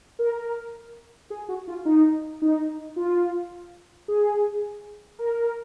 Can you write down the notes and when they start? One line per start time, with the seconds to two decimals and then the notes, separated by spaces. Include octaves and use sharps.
0.19 A#4
1.30 G#4
1.49 F#4
1.68 F4
1.85 D#4
2.42 D#4
2.96 F4
4.08 G#4
5.19 A#4